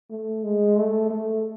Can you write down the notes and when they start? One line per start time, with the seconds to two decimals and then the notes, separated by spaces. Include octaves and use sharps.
0.10 A3
0.43 G#3
0.76 A3
1.10 A3